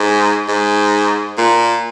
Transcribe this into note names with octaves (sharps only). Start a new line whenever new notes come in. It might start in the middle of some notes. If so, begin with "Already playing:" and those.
Already playing: G#2
G#2
A#2